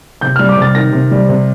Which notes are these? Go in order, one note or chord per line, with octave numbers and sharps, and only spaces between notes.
C3 G6
G3 F6
D6
C3 A6
D#3 A#6
C3
G3
C3